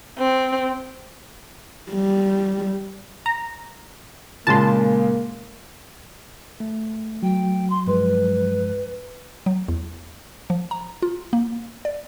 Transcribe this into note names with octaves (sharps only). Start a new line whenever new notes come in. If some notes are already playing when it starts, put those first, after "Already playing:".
C4
G3
A#5
A#2 C#3 G#3 A#3 A5 C6
A3
F#3 G5
C6
G2 F3 G#3 B4
F#3
E2
F3
A#5
F4
A#3
D5